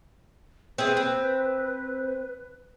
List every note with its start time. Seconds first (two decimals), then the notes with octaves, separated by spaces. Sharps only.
0.78 C4 E4 G#4 B4
0.97 C4